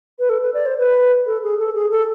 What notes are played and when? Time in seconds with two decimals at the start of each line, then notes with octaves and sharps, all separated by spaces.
0.19 B4
0.29 A4
0.41 B4
0.53 D5
0.65 C5
0.78 B4
1.26 A4
1.43 G#4
1.59 A4
1.74 G#4
1.91 A4